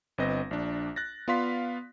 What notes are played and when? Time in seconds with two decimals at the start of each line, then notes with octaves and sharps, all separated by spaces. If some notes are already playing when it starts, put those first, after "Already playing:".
0.18 G1 C4 B4 D#5 A#6
0.51 A#1 D4
0.96 F#6 A6 A#6
1.28 B3 F4 D5 F5 C6 B6